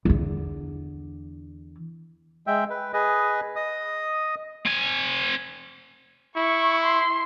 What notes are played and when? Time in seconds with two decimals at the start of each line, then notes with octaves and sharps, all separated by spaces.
0.05 E2 D3
2.47 G#3 E5 G5
2.70 B4
2.93 G#4 B4 D#5
3.56 D#5 D#6
4.66 C4 G#5
6.37 E4 C#6
6.83 C6